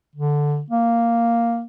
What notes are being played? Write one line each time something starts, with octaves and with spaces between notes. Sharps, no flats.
D3
A#3